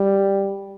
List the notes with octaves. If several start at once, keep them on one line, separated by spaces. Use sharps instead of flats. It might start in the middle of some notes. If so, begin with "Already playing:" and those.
Already playing: G3